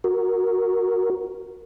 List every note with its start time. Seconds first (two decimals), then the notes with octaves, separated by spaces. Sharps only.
0.04 F#4 A#4